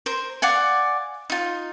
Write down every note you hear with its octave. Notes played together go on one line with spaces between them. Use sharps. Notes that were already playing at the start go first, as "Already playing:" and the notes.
A#4 C5
D5 F5 F#5 G#5
D#4 F4